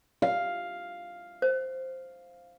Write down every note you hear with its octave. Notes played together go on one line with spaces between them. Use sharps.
F5
C5